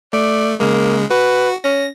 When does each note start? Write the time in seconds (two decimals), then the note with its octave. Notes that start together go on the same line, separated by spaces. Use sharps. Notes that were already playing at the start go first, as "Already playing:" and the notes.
0.13 A3 D5
0.60 C#3 G#3 A#3
1.11 F#4 B4
1.64 C#4 A#6